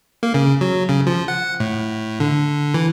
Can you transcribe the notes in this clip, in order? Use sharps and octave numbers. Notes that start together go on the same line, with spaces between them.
A#3
C#3
F#3
C#3
F3
F#5
A2
D3
E3